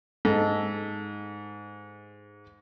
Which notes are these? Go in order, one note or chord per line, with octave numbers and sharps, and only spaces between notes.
G#2 D#4 A4